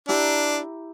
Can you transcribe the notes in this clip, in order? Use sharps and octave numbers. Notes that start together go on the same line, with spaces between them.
D4 E4 G4 A#5